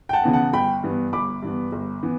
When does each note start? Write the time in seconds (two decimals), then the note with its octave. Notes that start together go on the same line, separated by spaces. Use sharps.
0.09 G5
0.13 F#5 A5
0.23 C#3 E3 B3
0.33 F#5 A5
0.53 G1 G5 B5
0.83 G2 E3 B3
1.13 G1 B5 D6
1.42 G2 E3 B3
1.72 G1
2.03 E3 B3